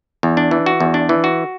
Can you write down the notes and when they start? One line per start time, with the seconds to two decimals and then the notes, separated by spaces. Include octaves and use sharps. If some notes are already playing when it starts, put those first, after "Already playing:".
0.23 E2
0.37 D4
0.51 E3
0.66 F#4
0.80 E2
0.94 D4
1.09 E3
1.24 F#4